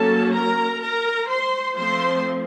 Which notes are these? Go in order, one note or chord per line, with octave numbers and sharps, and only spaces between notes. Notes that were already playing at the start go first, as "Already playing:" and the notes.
Already playing: F#3 A#3 C#4 A4 A5
A#4 A#5
A#4 A#5
C5 C6
F3 A3 C4 C5 C6